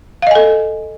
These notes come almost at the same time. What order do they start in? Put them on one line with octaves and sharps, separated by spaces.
F5 D#5 G#5 A4